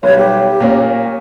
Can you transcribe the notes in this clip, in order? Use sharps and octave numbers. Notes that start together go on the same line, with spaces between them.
B1 G3 C#5
G4
A#2 A#3 C#4